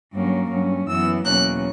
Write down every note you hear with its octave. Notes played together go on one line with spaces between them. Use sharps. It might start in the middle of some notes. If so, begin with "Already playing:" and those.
G2 F#3 A#3 C#4
G2 F#3 C#4
F#2 E3 B3 E6
E2 B2 F#3 A#3 C#4 F#6